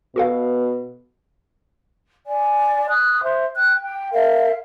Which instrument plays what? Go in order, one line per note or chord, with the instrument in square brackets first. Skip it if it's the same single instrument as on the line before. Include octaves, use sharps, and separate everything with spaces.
[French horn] B2 [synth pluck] F#4 A4 F5
[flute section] D5 G#5
D#6 F#6
C5 E5
G5 F#6
G5
A#4 E5 F5